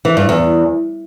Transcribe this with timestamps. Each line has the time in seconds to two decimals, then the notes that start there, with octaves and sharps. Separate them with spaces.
0.05 E3
0.17 G2
0.29 E2